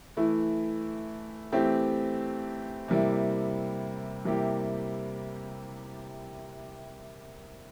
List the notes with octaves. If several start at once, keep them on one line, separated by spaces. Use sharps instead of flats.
E3 A3 E4
E3 A3 C4 G4
C3 G3 A#3 E4
C3 G3 A#3 E4 G4